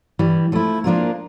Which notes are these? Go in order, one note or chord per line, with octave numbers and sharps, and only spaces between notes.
G2 E3 G3
F3 A3 E4
F3 A#3 D4 F4 A#4